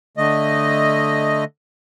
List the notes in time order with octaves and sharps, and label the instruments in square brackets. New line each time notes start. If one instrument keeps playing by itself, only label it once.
[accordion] D3 A3 D#5